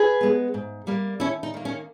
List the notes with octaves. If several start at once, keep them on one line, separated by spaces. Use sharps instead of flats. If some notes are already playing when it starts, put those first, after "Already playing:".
Already playing: G#4 B4
G#3 B3
G#2
G3 A#3
D#2 C#4 E4
D#4
D#3 A#3
C#4